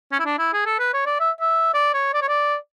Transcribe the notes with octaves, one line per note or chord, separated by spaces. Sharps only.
C#4
E4
D4
E4
G#4
A4
B4
C#5
D5
E5
E5
D5
C#5
D5
C#5
D5